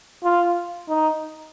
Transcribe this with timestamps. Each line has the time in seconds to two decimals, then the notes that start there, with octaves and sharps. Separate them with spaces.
0.24 F4
0.88 D#4